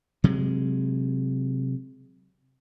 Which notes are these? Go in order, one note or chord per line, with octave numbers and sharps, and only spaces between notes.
C3 F#3 G#3